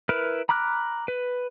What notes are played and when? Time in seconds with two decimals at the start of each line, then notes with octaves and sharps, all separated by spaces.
0.09 E4 A#4 B4 F6
0.49 A#5 B5 D6 F6 F#6
1.08 B4